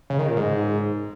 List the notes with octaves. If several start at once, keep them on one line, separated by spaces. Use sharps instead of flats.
C#3
D#3
A#2
G#2